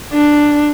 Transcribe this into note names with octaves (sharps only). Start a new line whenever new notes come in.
D4